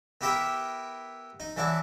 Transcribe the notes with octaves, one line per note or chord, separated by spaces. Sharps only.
B3 E4 G4 A#4 E5 G5
D#4
E3 F#3 D4 E4